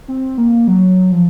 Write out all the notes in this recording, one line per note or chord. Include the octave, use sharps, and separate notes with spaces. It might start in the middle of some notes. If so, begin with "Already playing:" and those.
C4
A#3
F#3
F3